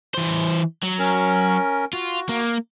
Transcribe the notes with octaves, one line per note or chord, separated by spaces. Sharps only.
E3 C5
F#3
C#4 A#4
F4 F#4
A#3